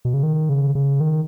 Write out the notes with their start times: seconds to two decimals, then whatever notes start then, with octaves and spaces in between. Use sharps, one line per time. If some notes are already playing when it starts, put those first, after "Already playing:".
0.05 B2
0.14 C#3
0.23 D#3
0.49 C#3
0.75 C#3
1.00 D#3